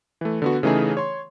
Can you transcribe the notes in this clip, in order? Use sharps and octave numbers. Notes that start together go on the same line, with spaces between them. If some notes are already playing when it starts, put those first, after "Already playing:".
E3 A3
D3 B3 F#4
C#3 E3 A3 D#4 G#4
C#5 C6